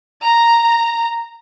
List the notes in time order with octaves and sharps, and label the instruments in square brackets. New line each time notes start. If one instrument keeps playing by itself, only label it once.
[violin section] A#5